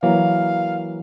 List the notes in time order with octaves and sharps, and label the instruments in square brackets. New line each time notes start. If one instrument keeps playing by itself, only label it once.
[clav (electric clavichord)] E3 F#3 A#3 [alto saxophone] F5